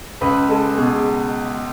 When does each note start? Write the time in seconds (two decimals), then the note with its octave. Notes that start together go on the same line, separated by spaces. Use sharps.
0.21 C#2 B4
0.49 G#3 A4
0.77 B2 G#4